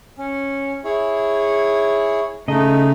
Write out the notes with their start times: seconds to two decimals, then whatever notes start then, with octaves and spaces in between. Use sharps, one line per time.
0.19 C#4
0.84 E4 G#4 C#5
2.48 C#3 A3 D#4 D#5